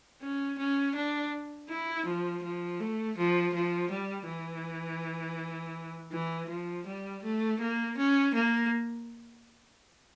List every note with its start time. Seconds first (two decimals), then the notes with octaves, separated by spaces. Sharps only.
0.22 C#4
0.58 C#4
0.95 D4
1.69 E4
2.06 F3
2.43 F3
2.80 A3
3.17 F3
3.54 F3
3.91 G3
4.28 E3
6.12 E3
6.49 F3
6.86 G3
7.23 A3
7.60 A#3
7.97 C#4
8.34 A#3